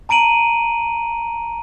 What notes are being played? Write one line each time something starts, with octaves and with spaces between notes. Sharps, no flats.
A5 A#5 D7 D#7 F#7